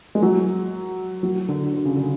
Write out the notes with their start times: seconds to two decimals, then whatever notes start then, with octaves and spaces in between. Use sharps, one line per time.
0.15 G#3
0.22 F#3
1.23 F#3
1.49 D3
1.74 D3
1.85 C#3
1.96 D3